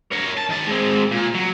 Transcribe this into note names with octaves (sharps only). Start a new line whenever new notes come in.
A#4 C#5
A5
D#3 A5
G#3 C4
A#2
F#3